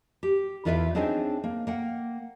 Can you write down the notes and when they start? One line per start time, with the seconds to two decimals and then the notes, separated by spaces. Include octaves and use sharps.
0.23 G4
0.65 E2 E4 F4 B4 D5 E5
0.95 C4 D4 D#4 G#4 C5 C#5
1.44 A#3
1.67 A#3 F#5 G5